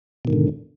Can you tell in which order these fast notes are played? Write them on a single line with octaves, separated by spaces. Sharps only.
B2 D#3 G#2 D3